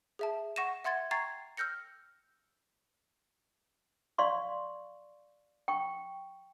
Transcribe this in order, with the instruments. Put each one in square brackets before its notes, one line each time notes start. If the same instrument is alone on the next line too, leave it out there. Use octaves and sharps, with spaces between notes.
[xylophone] G#4 E5 A5
F#5 C#6 A#6 D#7 E7
E5 F#5 C6 G#6 A6
G5 A#5 C#6 G#6 A6 C7
E6 F6 G6 A#6 C#7
[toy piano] D5 F5 C6 C#6
G5 C#6